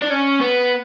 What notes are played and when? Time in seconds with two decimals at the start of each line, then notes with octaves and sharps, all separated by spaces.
0.02 D4
0.10 C#4
0.41 B3